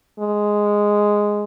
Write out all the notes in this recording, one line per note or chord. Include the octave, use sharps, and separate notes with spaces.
G#3